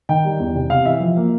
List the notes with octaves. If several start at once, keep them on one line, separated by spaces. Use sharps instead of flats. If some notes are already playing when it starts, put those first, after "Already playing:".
D#3 G5
G3
E2
C3
C3 F5
E3 E5
F3
A#3